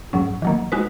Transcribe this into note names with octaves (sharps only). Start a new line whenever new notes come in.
G#2 F#3 C#4
D#3 F#3 A#3
G#3 D#4 F#4 B4